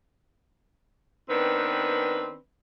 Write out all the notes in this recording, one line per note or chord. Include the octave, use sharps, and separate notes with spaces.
D#3 B3 C4 D4 B4